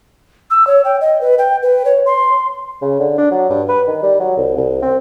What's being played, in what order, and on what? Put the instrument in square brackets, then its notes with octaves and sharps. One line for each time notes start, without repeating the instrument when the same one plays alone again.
[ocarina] E6
C#5
G5
D#5
B4
G5
B4
C#5
C6
[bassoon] C#3
D3
D4
F#3
G2
B4
D#3
G3
F#3
C2
C2
C4